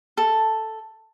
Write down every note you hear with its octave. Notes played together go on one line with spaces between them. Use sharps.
A4